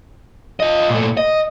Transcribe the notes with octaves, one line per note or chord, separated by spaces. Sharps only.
F4 D#5
A#2 A3
D#5